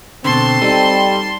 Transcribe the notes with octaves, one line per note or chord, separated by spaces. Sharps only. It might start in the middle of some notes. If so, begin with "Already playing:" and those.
B2 D3 C4 A5 C6
G3 D#4 A4